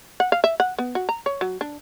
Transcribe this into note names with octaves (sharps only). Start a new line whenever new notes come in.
F#5
F5
E5
F#5
B3
F#4
A#5
C#5
F#3
D4